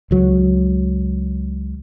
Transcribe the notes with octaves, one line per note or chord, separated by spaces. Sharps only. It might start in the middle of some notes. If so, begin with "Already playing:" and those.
C#2 F#3